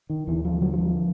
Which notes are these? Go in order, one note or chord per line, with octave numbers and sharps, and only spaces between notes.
D#3
D#2 E3
F3
D3 F#3
F#3
F3